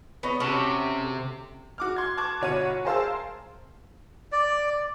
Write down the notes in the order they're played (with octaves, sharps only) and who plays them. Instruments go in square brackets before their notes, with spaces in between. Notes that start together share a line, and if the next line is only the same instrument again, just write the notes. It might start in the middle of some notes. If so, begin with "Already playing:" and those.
[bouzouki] B3 C#5 D#5
[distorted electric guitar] C3 [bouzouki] C#4 F#4 A4
[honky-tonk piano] F#4 D6 F6
C6 G#6
A5 C#6 D6 F#6 G#6
G1 B2 C#5 F#5 C#6 D#7
G#4 A#4 C5 F5 A5 E6
[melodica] D5